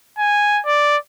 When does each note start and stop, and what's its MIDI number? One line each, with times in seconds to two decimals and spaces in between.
0.19 0.60 80
0.66 0.97 74